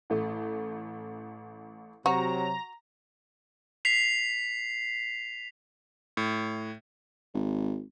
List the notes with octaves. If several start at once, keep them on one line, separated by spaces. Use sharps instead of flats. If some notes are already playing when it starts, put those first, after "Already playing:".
A1 A3
C3 F#3 F#4 A#5
B6 C7 F7
A2
G#1